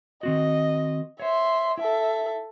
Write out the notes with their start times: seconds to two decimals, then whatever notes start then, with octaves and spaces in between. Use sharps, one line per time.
0.23 D#3 C4 F#4 D#5
1.20 C5 C#5 E5 C6
1.78 E4 A4 E5